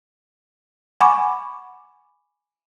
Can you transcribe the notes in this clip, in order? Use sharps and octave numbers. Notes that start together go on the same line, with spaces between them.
F#5 G#5 B5 C#6 D6